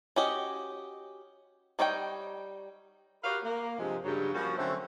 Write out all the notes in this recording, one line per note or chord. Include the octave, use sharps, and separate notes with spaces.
C#4 F#4 G4 D#5
G3 D#4 C#5 D5 G5
F#4 G4 A#4 B4 C#5 F5
A#3
G2 C3 F3 G#3
G2 C#3 F#3
F3 G3 A#3 C#4 F#4
D3 F3 F#3 A3 C4 C#4